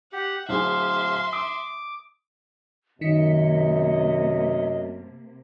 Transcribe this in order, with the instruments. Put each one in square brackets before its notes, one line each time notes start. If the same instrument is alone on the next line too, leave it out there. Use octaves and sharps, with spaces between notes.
[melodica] G4 [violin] F#5
[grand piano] D1 G#4 [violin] E5 C6 [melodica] F5
[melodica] D6 [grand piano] D#6
[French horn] F#2 [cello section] C3 A#3 [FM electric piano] D#3 B6 C#7 [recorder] D#5